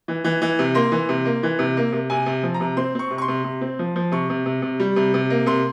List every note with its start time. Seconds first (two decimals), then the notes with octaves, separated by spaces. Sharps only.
0.08 E3
0.24 E3
0.42 E3
0.59 C3
0.75 A#3 C6
0.92 E3
1.09 C3
1.25 A#3
1.43 E3
1.59 C3
1.77 A#3
1.93 C3
2.10 C3 G#5
2.26 C3
2.43 F3
2.54 A#5
2.60 C3
2.77 C4 C6
2.95 C4 C#6
3.11 C3
3.18 C#6
3.22 C6
3.28 C3
3.44 C3
3.61 C4
3.79 F3
3.96 F3
4.12 C3 C#6
4.30 C3
4.46 C3
4.62 C3
4.80 G3
4.96 C3
5.14 C3
5.30 A#3
5.46 C3 C6